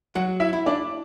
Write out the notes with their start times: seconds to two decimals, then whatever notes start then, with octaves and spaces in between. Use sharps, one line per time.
0.15 F#3 F#4 F#5
0.40 E4 E5
0.53 E4
0.66 D4 D5